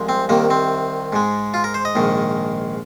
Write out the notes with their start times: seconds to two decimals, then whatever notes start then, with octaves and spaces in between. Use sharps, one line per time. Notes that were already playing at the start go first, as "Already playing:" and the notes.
Already playing: C2 C3 F3 G#3
0.09 C4
0.29 C2 C3 D#3 A#3
0.50 C4
1.13 G#2 G#3
1.54 F4
1.64 A#4
1.74 C5
1.85 D#5
1.95 A#1 G#2 D#3